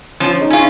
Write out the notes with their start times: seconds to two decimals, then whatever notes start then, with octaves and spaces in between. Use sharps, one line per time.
0.20 F3 C#4 F4
0.40 D#4 G#4
0.50 C#4 F4